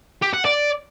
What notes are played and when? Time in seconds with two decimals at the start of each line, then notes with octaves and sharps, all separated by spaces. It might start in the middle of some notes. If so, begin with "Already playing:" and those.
0.22 G4
0.33 F#5
0.45 D5